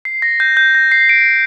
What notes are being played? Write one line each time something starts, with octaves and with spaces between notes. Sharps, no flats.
C7
A#6
G6
G6
A#6
C7
D7